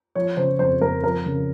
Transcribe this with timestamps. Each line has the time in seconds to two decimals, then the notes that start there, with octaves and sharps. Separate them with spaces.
0.15 F3 C#5
0.37 C#3 C5
0.59 F2 C5
0.81 F2 A#4
1.04 F3 A#4
1.26 C#3